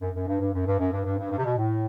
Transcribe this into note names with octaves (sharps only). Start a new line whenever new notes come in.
F#2
F#2
G2
G2
F#2
G2
F#2
G2
G2
G2
G2
C3
B2
A2